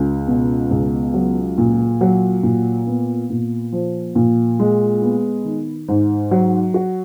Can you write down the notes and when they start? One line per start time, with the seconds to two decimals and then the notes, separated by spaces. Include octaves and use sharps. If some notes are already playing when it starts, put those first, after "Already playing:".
Already playing: C#2
0.27 B2
0.71 C#2
1.14 F#3
1.58 A#2
2.01 F#3
2.43 A#2
2.86 B3
3.30 A#2
3.72 F3
4.15 A#2
4.59 G#3
5.02 B3
5.45 D#3
5.88 G#2
6.31 F#3
6.74 F#4